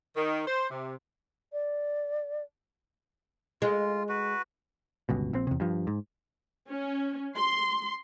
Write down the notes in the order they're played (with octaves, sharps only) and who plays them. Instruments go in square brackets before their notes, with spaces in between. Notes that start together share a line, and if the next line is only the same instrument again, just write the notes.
[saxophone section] D#3
C5
C3
[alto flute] D5
[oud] G#3 [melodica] F4
[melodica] F#4 B4
[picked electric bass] G1 C#2 B2
A#1 C4
E2 C3
G2 F3
G#2
[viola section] C#4
C6